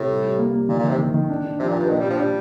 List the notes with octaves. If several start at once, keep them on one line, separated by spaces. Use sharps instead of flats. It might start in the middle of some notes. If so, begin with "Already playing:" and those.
Already playing: A2 C3
G3
G3
A#3
A#3
A#2 D#3
A#2
D#3
C3
D#3
D#3
D4
D4
C3 F3
A#2
F4
G2
A#2 D#3
G3
D4
F3
G3 D4